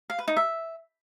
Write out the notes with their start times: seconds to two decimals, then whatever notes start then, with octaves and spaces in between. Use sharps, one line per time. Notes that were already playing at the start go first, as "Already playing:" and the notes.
0.10 F5
0.19 B4
0.28 D#4
0.37 E5